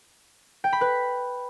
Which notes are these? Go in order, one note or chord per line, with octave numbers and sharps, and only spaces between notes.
G5
B5
B4